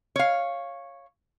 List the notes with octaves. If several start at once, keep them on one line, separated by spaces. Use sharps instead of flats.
C#5 F5